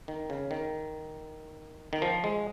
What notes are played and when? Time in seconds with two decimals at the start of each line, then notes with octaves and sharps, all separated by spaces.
0.08 D#3
0.30 C#3
0.51 D#3
1.93 D#3
2.02 F3
2.24 G#3